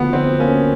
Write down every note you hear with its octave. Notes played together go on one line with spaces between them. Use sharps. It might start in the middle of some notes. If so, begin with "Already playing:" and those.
Already playing: D2 F3 B3
D2 C4
A#3 C#4